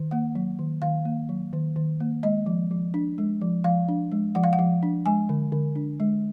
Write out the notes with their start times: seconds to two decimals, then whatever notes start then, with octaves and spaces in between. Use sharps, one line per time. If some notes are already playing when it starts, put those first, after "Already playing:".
Already playing: D#3
0.11 A#3 F#5
0.35 F#3
0.59 D#3
0.82 D#3 F5
1.05 A#3
1.29 F#3
1.53 D#3
1.76 D#3
2.00 A#3
2.23 G#3 D#5
2.46 F3
2.71 F3
2.94 D4
3.18 G#3
3.41 F3
3.64 F3 F5
3.88 D4
4.12 G#3
4.35 F3 F#5
4.44 F5
4.53 F#5
4.59 F3
4.83 D4
5.06 G#3 G#5
5.29 D3
5.52 D3
5.76 D4
6.00 G#3